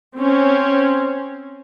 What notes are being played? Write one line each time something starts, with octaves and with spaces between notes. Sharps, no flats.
C4 C#4